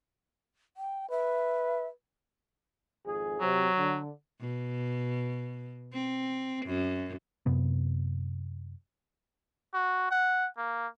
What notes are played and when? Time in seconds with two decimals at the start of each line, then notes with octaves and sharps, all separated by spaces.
0.77 G5
1.10 B4 E5
3.05 G#1 F2 G#4
3.40 C3 F#3
3.76 D3
4.40 B2
5.93 C4
6.66 F#2
7.46 F#2 C3 B3
9.74 F#4
10.11 F#5
10.57 A#3